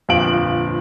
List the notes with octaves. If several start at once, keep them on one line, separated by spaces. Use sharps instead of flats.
G1 F2 A#2 F3 D7 F#7